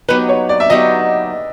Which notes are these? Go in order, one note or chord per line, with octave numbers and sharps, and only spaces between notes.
F#3 B3 D#4 G4 B4
C#5
D5
E5
F#3 B3 D#4 G4 D#5